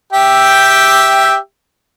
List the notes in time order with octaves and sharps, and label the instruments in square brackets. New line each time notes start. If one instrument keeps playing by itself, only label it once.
[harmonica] G4 E5 G5